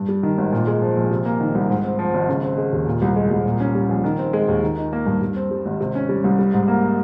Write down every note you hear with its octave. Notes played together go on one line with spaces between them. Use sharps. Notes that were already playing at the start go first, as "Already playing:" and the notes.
Already playing: G2
G3
D#3
G#1
A#2
G#3
F3
A#1
C3
A#3
D#3
C2
G#2
C4
F3
G#1
C#3
C4
G#3
D#2
A#2
C2
G#3
C2
A#2
C#4
G3
A#1
D#3
C4
G#3
D#2
D#3
D#4
A#3
G2
G2
C4
G3
G#1
C3
C#4
G3
C2
G3
G#2
A#3